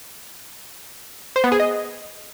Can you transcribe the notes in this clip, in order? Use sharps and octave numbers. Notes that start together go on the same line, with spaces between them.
C5
B3
G#4
D#5